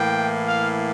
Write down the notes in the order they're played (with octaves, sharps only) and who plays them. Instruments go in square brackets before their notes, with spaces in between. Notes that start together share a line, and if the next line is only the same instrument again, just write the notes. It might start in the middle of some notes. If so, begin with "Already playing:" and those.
Already playing: [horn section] A2 E3 A#3 G5
F5